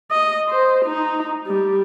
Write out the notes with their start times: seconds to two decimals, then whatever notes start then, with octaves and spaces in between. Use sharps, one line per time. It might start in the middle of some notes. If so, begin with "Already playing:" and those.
0.11 D#5
0.49 C5
0.85 D#4
1.47 G3